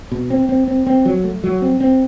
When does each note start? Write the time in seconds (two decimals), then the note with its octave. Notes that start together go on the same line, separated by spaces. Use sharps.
0.12 B2
0.30 C4
0.49 C4
0.68 C4
0.87 C4
1.05 F#3
1.24 A3
1.44 F#3
1.62 C4
1.80 C4